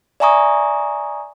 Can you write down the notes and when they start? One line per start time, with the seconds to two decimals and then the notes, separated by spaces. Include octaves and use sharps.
0.20 D5 E5 G#5 A#5 C#6 D#6